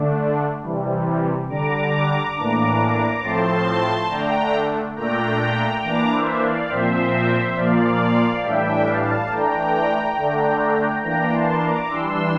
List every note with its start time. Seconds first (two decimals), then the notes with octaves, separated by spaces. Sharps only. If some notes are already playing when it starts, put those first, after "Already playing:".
Already playing: D3 A3 D4
0.62 C3 E3 G3
1.49 D3 G3 D4 A#5 D6
2.36 A2 E3 A#3 D4
3.22 A2 F3 A3 C4 A5 C6
4.09 D3 A3 D4 G5 A#5
4.96 A#2 A3 D4 G5 A#5
5.82 E3 A#3 D4 A#5 D6
6.11 C5 E5
6.40 D5 F5
6.69 A#2 F3 C4 C5 E5
7.55 A#2 F3 A#3 D5 F5
8.43 A2 E3 G3 D4 E5 G5
8.86 F5 A5
9.29 E3 A3 D4 G5 A#5
10.16 D3 A3 D4
11.02 E3 A#3 D4 G5 A#5
11.31 A5 C6
11.61 A#5 D6
11.89 E3 G3 D4 C6 E6